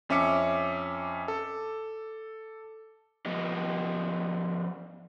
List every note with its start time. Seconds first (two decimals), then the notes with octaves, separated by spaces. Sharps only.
0.09 F2 C#4 E5 D6 C#7
1.28 A4
3.26 F3 B3 G4 D#5